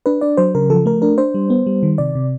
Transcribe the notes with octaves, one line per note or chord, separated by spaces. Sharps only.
D4 B4
D4 D5
F#3 C5
C#3 A#4
F3 A4
A3 A#4
D4 A#4
D4 C5
G3
B3
G3
D#3
C3 D5
C3